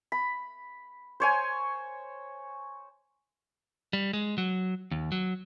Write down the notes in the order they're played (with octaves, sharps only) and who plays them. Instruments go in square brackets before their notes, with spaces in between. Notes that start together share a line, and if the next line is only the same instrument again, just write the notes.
[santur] B5
C5 C#5 G#5
[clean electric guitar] G3
G#3
F#3
D#2
F#3